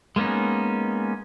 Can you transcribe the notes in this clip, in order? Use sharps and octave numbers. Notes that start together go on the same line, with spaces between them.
G#3 A#3 B3 C#4 D#4